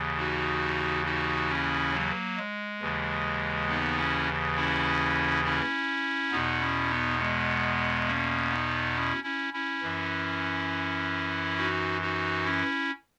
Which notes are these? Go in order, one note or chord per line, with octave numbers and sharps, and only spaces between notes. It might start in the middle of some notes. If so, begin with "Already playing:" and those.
Already playing: D#2 C#3 E3
D#4 F#4
D#4 F#4
C#4 E4
F#3 A#3
G#3
D#2 C#3 E3
B3 D#4
C#4 E4
C#4 E4
C#4 E4
E2 B2 B3 D#4
C#4 E4
B3 D#4
G#3 B3
A#3 C#4
B3 D#4
C#4 E4
C#4 E4
C#4 E4
F#2 E3
D#4 F#4
D#4 F#4
C#4 E4